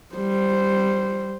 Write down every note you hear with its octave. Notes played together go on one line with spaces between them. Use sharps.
G3 C5